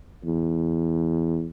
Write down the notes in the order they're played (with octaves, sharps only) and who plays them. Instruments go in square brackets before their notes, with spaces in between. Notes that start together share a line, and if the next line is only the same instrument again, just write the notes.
[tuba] E2